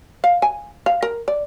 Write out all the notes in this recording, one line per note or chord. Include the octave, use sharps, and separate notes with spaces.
F5
G#5
F5
A#4
D5